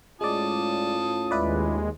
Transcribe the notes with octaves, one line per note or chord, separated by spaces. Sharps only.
A2 G#3 C#4 F4 D5 A5 D#6
D#2 G#3 E4 B4 D5